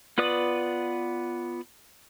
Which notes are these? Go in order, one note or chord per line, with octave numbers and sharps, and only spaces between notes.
B3 F4 B4 D5 D#6